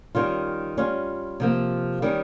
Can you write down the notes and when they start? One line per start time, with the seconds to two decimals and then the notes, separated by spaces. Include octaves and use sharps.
0.15 D#3 G3 C#4 F4
0.77 G3 C#4 F4
1.40 C3 F3 A#3
2.02 D#3 G3 C#4